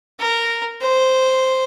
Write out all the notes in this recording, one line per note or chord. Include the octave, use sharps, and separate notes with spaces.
A#4
C5